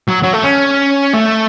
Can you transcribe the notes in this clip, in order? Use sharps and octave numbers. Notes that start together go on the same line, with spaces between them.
F#3
F#3
A3
C#4
A3